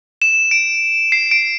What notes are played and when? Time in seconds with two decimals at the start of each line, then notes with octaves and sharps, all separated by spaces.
0.22 E7
0.51 D7
1.12 C7
1.31 D7